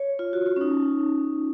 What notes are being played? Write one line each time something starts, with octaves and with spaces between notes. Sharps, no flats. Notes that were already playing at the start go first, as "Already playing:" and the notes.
Already playing: C#5
F4
F#4
F4
C#4
D#4